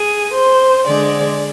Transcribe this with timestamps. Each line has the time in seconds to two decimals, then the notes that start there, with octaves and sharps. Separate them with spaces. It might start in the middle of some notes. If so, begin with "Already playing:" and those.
Already playing: G#4
0.34 C5
0.87 D3 G#3 D5